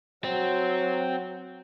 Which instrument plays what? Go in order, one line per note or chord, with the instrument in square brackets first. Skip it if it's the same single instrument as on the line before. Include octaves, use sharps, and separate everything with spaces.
[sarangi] F#3 [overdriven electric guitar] C4